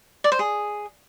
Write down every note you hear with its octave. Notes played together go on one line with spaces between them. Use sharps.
D5
C5
G#4